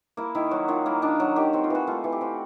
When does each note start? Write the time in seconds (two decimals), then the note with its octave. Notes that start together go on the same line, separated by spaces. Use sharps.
0.17 A#3 E4
0.35 D#3 E4
0.51 F#3 F#4
0.68 D#3 F4
0.86 A#3 E4
1.02 D#3 D4
1.20 F#3
1.36 D#3 G4
1.53 C4 F#4
1.64 F4
1.70 E3 F#4
1.87 A3 F4
2.04 E3
2.12 G4
2.21 C4 F#4